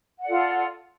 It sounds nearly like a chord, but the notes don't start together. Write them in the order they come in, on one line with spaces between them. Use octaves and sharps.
F#5 D5 A4 F4